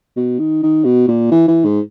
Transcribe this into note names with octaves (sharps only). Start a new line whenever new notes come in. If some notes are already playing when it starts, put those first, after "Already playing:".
B2
D#3
D#3
B2
A#2
E3
E3
G#2